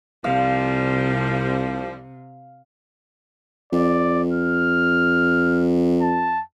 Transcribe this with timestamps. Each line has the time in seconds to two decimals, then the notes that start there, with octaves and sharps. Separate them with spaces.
0.24 C2 C3 F3 G3 F5
3.73 F2 D5
4.33 F6
6.01 A5